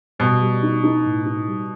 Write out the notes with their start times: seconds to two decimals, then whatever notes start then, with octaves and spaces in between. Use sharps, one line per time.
0.19 B2 G3
0.41 G3
0.63 D#4
0.83 D#4
1.05 A2
1.25 D#4
1.48 G3